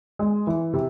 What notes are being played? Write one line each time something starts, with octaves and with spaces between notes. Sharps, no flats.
G#3
E3
C3